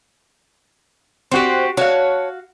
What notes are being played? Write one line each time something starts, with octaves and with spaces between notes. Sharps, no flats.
C4 F#4 G4 C5
F#4 C#5 F5 A5